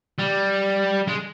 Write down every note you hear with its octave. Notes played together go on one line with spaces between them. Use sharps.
G3
G#3